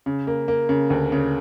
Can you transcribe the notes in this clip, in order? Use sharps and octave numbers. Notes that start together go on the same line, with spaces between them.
C#3
A#3
A#3
C#3
D2
C#3